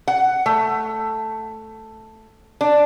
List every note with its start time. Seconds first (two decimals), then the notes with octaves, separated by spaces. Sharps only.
0.08 F#5
0.46 A3
2.61 D4